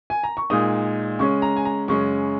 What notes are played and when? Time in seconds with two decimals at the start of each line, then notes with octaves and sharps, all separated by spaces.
0.10 G#5
0.24 A#5
0.37 C#6
0.50 A#2 G#3 D#4 D#6
1.19 C#3 G#3 C#4 C#6
1.42 A#5
1.56 G#5
1.65 A#5
1.88 F#2 C#3 G#3 C#4 C#6